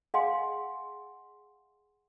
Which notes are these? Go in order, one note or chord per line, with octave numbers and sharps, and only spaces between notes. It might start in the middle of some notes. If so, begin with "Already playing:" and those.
G#4 D#5 F5 F#5 G#5 C6